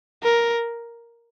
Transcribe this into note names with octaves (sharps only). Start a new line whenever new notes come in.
A#4